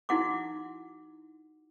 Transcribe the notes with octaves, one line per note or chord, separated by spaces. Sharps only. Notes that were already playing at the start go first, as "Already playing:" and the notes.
D#4 E4 F#4 F#5 C6 D6